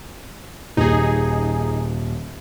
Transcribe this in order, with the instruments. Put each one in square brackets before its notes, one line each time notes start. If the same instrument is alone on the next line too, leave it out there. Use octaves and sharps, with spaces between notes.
[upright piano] D#1 [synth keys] D#4 G#4